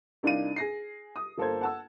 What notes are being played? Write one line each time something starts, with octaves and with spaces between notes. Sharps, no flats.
C2 D4 D#4 F5 D#7
G#4 A#6 C7
D#6
G1 A#3 A4 A#4 C5 G#6
F#5 A5 E6